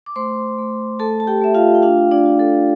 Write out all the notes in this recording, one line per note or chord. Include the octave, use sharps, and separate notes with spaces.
D6
A3 C5 C6
A3
A3 A4 A5
A5
G4 G5
A3 E5
F4 F5
G5
D4 F4 F5
D4 D5
F4
A4